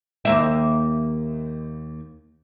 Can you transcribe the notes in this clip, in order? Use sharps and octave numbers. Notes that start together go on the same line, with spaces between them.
D#2 A#3 E5